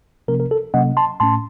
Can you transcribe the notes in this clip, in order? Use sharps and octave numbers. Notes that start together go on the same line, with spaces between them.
C3 F3 A#3 C#4 A#4
A#4
A4
C3 F#3 A#3 C#4 D#5 F#5
A5 C6
A2 A3 C#4 A5 C6